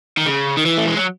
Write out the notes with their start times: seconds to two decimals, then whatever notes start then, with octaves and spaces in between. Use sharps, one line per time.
0.17 D#3
0.26 C#3
0.57 D#3
0.65 E3
0.77 A3
0.87 G#3
0.97 F#3